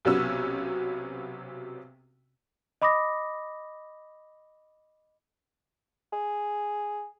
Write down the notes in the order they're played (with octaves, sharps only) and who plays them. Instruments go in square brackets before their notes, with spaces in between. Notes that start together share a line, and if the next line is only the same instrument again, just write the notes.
[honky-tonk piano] B1 C3 F#3 B3 C#4 E6
[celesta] D#5 B5 D6 D#6 A#6
[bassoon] G#4